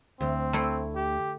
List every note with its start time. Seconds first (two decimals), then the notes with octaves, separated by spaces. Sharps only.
0.21 D2 C4
0.53 A3 E4 C6
0.95 G4